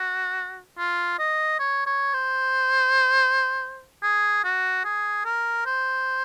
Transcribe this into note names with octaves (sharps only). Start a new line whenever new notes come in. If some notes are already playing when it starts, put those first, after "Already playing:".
Already playing: F#4
F4
D#5
C#5
C#5
C5
G#4
F#4
G#4
A#4
C5